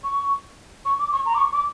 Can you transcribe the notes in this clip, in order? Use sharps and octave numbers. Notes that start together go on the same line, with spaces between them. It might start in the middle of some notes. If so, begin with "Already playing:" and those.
C#6
C#6
D6
C#6
A#5
D6
C#6
D6